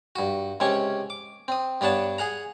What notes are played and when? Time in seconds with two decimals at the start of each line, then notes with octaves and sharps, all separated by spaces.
0.16 G2 F#4
0.60 C#2 C3 C#4 C#5 C#6
1.10 D6
1.48 C4 D#6
1.81 G2 B3 D4 C#5 F#5 A5
2.18 G#4 F#5 A#5